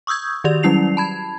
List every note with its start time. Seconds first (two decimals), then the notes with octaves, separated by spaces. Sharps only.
0.07 C#6 D#6 E6 G6 G#6
0.44 D#3 F#4 G4 D5 F7
0.63 F#3 G3 C#4 E4 C7 F7
0.97 A5 B5 G#6